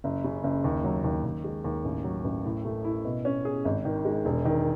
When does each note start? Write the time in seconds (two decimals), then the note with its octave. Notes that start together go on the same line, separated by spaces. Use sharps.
0.04 F#1
0.24 C#3
0.44 F#1
0.64 D#2
0.84 F#3
1.04 D#2
1.24 D#2
1.44 G#3
1.64 D#2
1.85 A1
2.04 F#3
2.24 A1
2.45 A2
2.65 A3
2.84 E4
3.05 B2
3.25 C#4
3.45 G#4
3.65 G#1
3.85 D#3
4.05 G#3
4.25 E1
4.45 D#3